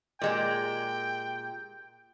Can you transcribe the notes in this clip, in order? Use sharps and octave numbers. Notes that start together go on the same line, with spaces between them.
A#2 G#3 G4 G5